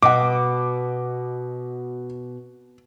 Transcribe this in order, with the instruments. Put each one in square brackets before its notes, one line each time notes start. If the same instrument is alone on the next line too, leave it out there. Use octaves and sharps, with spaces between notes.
[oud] B2 [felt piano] D#5 F#5 [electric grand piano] D6